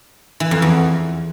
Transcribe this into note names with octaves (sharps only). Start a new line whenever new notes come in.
E3
F2
E2